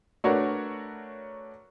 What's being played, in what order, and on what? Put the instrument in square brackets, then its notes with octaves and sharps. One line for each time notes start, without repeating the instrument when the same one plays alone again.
[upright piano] A3 D4 F#4 A#4 B4 C#5